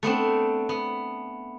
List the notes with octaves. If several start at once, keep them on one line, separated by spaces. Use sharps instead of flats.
A3 B3 C4 D4
B3